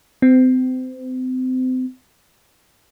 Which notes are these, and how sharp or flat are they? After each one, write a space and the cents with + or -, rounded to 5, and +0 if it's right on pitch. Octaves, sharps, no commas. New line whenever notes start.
C4 -35